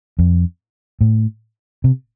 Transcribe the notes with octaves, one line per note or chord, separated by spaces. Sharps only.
F2
A2
C3